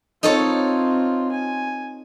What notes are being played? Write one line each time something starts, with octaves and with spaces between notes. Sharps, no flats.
C4 D#4 F4 A4 C#5
G#5